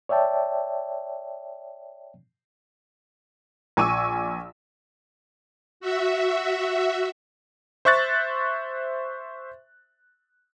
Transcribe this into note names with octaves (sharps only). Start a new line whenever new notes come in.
C#5 D5 E5 G5 A5
A#1 G#5 C#6 D6 E6 D#7
F#4 E5
C5 E5 C#6 F#6 A6